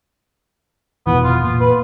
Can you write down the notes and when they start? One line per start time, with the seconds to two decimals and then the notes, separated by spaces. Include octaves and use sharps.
1.07 F1 B2 E3 B3
1.24 F4
1.44 A#2 F4
1.60 B4